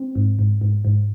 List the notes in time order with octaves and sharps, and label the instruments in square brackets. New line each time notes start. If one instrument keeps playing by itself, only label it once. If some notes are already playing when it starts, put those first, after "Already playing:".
Already playing: [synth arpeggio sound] C4
G#2
G#2
G#2
G#2